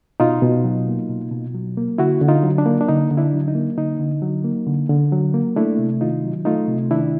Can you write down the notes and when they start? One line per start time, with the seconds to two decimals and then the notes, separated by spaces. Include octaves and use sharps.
0.20 B2 D#4 F4
0.42 B2
0.64 F#3
0.88 A#3
1.09 B2
1.31 B2
1.55 F#3
1.77 A#3
1.98 D3 E4 F#4
2.21 D3
2.28 D#4 F4
2.43 F#3
2.58 D4
2.66 A#3
2.81 D4
2.88 D3 D#4
3.11 D3
3.18 D4 E4
3.33 F#3
3.48 D#4
3.55 A#3
3.78 D3 D#4
3.99 D3
4.22 F#3
4.44 A#3
4.67 D3
4.89 D3
5.12 F#3
5.34 A#3
5.56 A3 D4 E4
5.79 C3
6.01 D#3 D#4 F4
6.24 F#3
6.45 A3 D#4 F4
6.68 C3
6.91 D#3 D4 E4